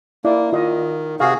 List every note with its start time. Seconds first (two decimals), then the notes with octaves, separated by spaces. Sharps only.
0.25 A#3 E4 D5
0.53 D#3 F4 D#5
1.20 C3 F#4 G#4 F5